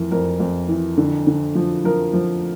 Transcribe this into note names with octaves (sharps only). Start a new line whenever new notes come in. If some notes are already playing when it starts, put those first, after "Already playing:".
Already playing: F2 E3 A#4
F2 A#4
F2
E3
D3
D3
F3
F3 A#4
F3